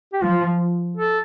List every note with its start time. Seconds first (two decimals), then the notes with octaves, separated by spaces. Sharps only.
0.13 G4
0.22 F3 F4
0.97 A4